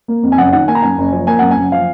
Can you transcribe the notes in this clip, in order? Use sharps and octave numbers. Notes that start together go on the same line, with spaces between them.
A#3
F2
G#5
F#1 F#5
D#3 F#5
A#3 G#5
A#5
F#2 G#5
F#1
F3
A#3 G#5
F#2 F#5
G#5
F#1
F3 F5